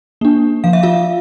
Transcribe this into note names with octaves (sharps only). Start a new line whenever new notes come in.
A#3 D4
F3 F5
E5
F4 F5